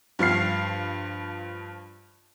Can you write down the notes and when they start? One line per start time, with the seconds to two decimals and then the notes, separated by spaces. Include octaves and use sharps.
0.19 G2 F3 F6 C7